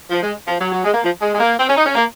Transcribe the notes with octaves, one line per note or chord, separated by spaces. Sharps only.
F3
G#3
F3
F#3
F#3
G#3
A#3
F3
G#3
G#3
A#3
C4
C#4
D#4
C#4
A#3